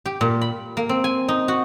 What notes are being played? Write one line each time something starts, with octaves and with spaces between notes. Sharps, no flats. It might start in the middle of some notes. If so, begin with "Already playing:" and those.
G4
A#2
B5
A#3
C4
G#5
D#4
F#4